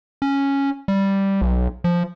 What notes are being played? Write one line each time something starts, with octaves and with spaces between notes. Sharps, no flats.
C#4
G3
B1
F3